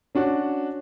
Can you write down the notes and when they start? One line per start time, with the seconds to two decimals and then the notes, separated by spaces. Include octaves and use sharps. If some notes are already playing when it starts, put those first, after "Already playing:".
0.15 C#4 D4 F#4